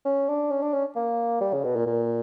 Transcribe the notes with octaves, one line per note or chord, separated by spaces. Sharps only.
C#4
D4
C#4
D4
C#4
A#3
G3
C#3
B2
A#2
A#2